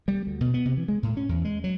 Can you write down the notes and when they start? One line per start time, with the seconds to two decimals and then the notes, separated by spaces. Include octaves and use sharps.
0.08 G3
0.27 D2
0.41 B2
0.54 B3
0.65 C3
0.77 E3
0.88 G#3
1.03 A2
1.17 C#4
1.29 E2
1.45 G#3
1.64 F#3